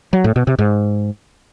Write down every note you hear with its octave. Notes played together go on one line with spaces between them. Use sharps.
F#3
A2
B2
C3
G#2